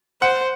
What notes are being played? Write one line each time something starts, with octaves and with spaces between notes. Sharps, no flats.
C5 F#5